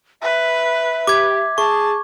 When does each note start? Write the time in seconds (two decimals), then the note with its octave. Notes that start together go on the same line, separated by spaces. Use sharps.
0.22 B4 E5
1.07 G4 D6 G#6
1.58 G#4 A5 C#6